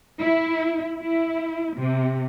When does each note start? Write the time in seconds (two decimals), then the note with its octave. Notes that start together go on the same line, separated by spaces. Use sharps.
0.21 E4
0.98 E4
1.76 C3